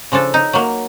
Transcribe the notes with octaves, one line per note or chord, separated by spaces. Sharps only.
C#3 F3 D4 A4
D#4
F#3 A#3